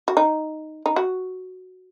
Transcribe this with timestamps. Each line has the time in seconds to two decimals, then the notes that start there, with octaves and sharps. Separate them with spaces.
0.08 F#4
0.17 D#4
0.86 D#4
0.96 F#4